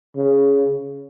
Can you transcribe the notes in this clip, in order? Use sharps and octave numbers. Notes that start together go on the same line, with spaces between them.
C#3